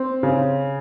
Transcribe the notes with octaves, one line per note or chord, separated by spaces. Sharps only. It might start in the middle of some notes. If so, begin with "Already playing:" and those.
Already playing: C4
C#3